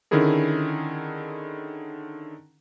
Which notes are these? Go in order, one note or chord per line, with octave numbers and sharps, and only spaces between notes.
D3 D#3 C#4 E4 G#4 A#4